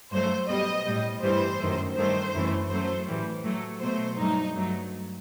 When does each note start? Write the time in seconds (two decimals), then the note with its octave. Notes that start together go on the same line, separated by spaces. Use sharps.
0.11 G2 F#3 A3 C5
0.48 B2 G3 D#5
0.86 A2 G3
1.22 G2 E3 G3 C5
1.59 F#2 D#3 A3
1.96 G2 D#3 A3 C5
2.34 F#2 E3 A3
2.70 F#2 F#3 A3 C5
3.07 A2 E3 G3
3.44 A2 F#3 A3
3.81 B2 F#3 A3 C5
4.18 G2 F#3 A3 D#4
4.55 G2 F#3 A3